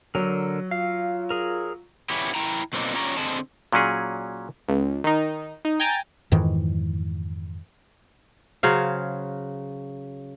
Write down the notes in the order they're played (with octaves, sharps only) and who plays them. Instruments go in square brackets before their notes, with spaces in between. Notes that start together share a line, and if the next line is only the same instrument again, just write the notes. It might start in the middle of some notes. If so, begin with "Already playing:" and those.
[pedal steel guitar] D3 A#4 [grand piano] F#3
[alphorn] F4 [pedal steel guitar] F5
[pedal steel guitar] G#4 A#4
[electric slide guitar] B3 C#4 E4 G4
E4 G5 A#5
B2 F#3 A#3 C4 D4 D#4
C#4 F4 G4 C#5 D5 A#5
D3 C4 G#4 D#5 A5
[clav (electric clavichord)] A#2 F#3 C#4 G#4
[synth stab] C#2
D#3 D#4
D#4
G5 G#5 A#5 A6
[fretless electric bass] F2 G#2 D#3 E3
[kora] C#3 F#3 C5 F5